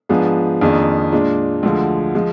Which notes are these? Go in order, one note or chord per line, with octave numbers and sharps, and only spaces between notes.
G#2 F3 B3 D4 G#4
F2 D#3 A#3 D4 G#4
A#2 G#3 D4
D2 D3 F3 G#3
F3 G#3